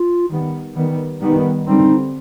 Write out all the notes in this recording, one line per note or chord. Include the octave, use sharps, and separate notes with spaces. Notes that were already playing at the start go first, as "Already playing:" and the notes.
Already playing: F4
D#3 G3 B3
D#3 G3 B3
D#3 G3 B3 D#4
D3 G3 C4 D#4